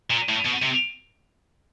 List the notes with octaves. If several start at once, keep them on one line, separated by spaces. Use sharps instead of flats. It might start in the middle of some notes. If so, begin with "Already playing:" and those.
A#2
A2
B2
C3